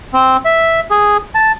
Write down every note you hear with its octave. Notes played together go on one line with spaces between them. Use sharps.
C4
E5
G#4
A5